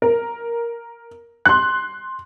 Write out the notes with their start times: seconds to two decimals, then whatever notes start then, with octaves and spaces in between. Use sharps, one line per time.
0.02 A#4
1.45 C6 F#6